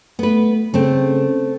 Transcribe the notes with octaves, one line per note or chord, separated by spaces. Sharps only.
A3 B3 B4
C#3 A3 C4